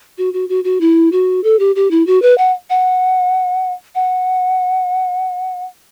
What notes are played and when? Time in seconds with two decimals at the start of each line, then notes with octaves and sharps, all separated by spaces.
0.18 F#4
0.34 F#4
0.49 F#4
0.64 F#4
0.81 E4
1.12 F#4
1.44 A4
1.59 G4
1.76 G4
1.91 E4
2.07 F#4
2.22 B4
2.38 F#5
2.70 F#5
3.95 F#5